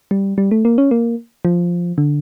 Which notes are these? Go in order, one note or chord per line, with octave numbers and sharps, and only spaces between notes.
G3
G3
A3
A#3
C#4
A#3
F3
D3